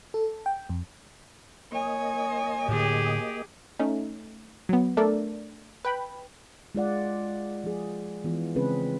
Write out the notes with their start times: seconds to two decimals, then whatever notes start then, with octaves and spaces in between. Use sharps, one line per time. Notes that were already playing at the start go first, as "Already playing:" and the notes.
0.14 A4
0.46 G5
0.70 F2
1.72 A#3 C#5 D#5 G#5
2.68 A2 D3 G4 G#4
3.79 A3 C#4 D#4
4.69 F#3 B3
4.97 A3 D4 A4 A#4 D5
5.85 B4 G5 B5
6.75 G#3 F4 D5 F#5
7.64 F3 G#4
8.24 E3 B3 F4
8.56 C#3 G#3 C4 C#4 G#4 B4